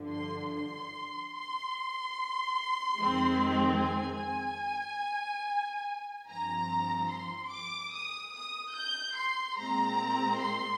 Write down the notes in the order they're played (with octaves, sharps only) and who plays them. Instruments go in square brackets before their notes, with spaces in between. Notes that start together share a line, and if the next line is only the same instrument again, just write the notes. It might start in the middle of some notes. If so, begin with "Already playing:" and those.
Already playing: [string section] G2 D3 F3
C6
C6
C6
F2 D#3 G#3 C4
G#5
G2 F3 C4 A#5
C6
D6
D#6
D#6
G6
C6
A#2 G#3 C4 A#5
C6